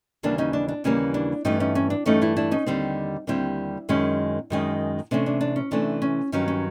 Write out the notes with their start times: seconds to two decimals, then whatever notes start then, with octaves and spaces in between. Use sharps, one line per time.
0.23 D#2 C#3 E3 G3 A#3 D4
0.38 C#4 D#4
0.53 D4
0.68 D4
0.84 D#2 C#3 E3 G3 A#3 C#4
1.14 D4
1.45 G2 E3 A3 C#4 D#4
1.60 C#4 D#4
1.75 C#4
1.90 D4
2.06 G2 E3 A3 C#4 D#4
2.22 D4 E4
2.37 D4 E4
2.51 C#4 D#4
2.67 D#2 D3 G3 C4
3.27 D#2 D3 G3 C4 D4 E4
3.89 F#2 D#3 G#3 C#4
4.50 F#2 D#3 G#3 C#4
5.11 C3 E3 A3 C#4 D4
5.26 D4
5.41 D4
5.56 C#4
5.71 C3 E3 A3 C#4 D4
6.02 C#4
6.32 G2 D#3 F#3 C#4
6.48 C#4